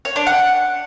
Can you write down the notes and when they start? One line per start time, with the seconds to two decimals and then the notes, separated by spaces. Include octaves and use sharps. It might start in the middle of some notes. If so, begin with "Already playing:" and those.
0.05 C#5
0.16 D4
0.27 F#5